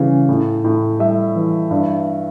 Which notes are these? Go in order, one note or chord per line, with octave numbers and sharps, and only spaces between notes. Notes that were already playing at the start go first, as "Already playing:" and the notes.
Already playing: C#3 E3 G3
A2
A2
G3 E5
E3
G2